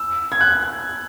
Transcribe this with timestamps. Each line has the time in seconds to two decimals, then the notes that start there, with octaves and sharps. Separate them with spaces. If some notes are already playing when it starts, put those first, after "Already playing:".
Already playing: E6
0.32 G#6
0.41 F#6